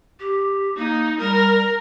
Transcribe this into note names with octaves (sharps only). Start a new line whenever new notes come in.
G4
A#3 D#4
G3 A#4